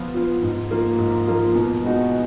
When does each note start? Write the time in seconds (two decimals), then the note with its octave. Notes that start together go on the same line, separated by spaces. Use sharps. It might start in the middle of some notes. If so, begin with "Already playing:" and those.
Already playing: F3 B3 F4
0.14 B3 F4
0.42 G#2
0.71 F3 A#3 F4
0.98 G#2
1.27 F3 A#3 F4
1.55 B2
1.84 G#3 B3 D#4 F#4